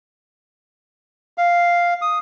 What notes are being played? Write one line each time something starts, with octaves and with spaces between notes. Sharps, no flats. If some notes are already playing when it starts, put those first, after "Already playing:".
F5
D#6